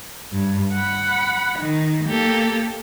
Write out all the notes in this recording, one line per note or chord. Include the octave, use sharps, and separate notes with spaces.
G2
F#5 B5
D#3
A#3 G4 A4